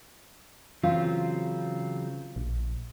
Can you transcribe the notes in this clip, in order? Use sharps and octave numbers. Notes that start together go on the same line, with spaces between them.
C#3 E3 F#3 C4 F4
A#1